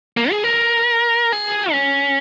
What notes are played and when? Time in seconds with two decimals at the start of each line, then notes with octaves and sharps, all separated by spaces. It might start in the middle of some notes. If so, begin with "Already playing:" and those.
0.17 A#3
0.31 G#4
0.44 A#4
1.32 G#4
1.72 C#4